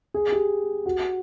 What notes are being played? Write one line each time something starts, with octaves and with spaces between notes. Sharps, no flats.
G#4
G4
F#4